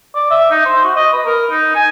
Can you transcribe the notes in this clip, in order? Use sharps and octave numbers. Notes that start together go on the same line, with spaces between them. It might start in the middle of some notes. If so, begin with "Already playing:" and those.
D5
E5
D#4
C5
F#4
D#5
B4
A#4
D#4
G#5